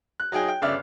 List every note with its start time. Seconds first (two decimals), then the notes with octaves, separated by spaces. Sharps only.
0.20 F#6
0.32 F#3 D#4 G#4 G5
0.48 G5
0.62 G1 C#3 D5 E5 F6